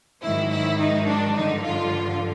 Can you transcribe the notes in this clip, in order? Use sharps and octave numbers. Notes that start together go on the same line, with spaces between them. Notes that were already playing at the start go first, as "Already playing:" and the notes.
G#2 D#3 F#3 E4
E4
D#4
D4
G2 D3 F3 D#4
F4